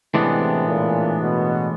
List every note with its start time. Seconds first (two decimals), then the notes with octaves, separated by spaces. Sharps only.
0.14 A2 C3 E3 G#3 B3 D4
0.68 A#2
1.22 B2